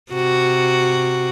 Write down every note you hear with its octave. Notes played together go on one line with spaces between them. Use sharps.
C3 F#4